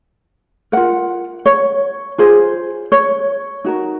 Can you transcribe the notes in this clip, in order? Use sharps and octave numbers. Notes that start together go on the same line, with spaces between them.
F4 A#4 F#5
C#5
F4 G#4 C5
C#5
D#4 F#4 A#4